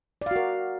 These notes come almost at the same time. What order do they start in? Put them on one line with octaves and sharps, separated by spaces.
D5 F5 F#4 A#4